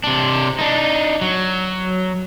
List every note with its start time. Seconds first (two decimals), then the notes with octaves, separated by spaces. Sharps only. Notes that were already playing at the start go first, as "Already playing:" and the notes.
0.04 C3 D4
0.59 D4 D#4
1.21 F#3